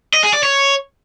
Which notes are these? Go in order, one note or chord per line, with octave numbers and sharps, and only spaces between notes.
D#5
G#4
D5
C#5